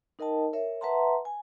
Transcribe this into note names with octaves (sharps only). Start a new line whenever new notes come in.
D#4 A#4 D#5 G5 A5
A#4 C#5 E5
B4 E5 F#5 A5 A#5 C6
G#5